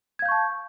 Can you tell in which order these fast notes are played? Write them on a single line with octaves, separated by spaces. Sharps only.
G#6 F5 G6 C#6 A5